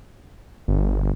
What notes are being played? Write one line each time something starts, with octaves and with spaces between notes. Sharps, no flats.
G1